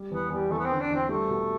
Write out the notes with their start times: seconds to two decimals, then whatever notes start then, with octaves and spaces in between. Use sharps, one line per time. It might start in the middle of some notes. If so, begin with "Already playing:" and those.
Already playing: G3
0.11 E2 B3
0.30 E2 G3
0.50 E2 A3
0.58 B3
0.65 C4
0.70 D3
0.80 D4
0.90 E2 C4
1.09 G3 A3
1.30 B2